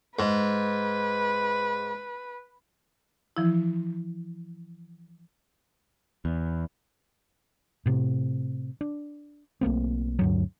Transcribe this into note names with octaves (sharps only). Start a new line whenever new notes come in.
G#2 B4
E3 F3 E4
E2
A2 C3
D4
B1 A3 A#3 C4
D2 G2 F#3